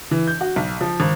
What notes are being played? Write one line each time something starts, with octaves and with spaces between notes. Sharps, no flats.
E3
G6
F#4
B1
F3
G#1